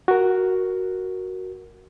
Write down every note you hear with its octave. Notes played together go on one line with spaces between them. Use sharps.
F#4 A#4